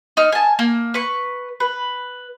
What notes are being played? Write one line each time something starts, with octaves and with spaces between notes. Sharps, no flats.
D#4 F6
G#5 A5
A#3
B4 C#6
B4